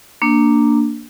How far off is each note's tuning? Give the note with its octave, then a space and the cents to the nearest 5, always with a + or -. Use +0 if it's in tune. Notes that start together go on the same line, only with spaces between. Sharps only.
A#3 -10 D4 +0